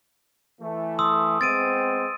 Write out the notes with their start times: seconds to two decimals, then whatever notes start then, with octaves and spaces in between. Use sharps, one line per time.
0.61 E3 A3
0.99 C6 D#6 E6
1.41 G#3 B3 C4 A6 D7 D#7